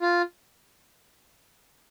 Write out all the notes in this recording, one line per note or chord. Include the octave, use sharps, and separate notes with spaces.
F4